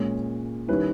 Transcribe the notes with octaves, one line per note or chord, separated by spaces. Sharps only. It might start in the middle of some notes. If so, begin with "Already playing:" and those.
Already playing: A#2 G#3 C#4
D#3 G3 C#4 E4 B4